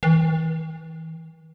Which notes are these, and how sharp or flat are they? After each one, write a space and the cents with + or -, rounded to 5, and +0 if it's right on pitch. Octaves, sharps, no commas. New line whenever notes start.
E3 -40